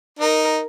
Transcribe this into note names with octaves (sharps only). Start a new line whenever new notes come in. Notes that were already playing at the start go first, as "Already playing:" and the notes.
D#4 A#4